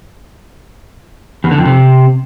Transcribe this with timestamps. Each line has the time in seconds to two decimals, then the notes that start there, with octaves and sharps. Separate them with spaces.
1.44 E2
1.51 D3
1.58 F2
1.65 C3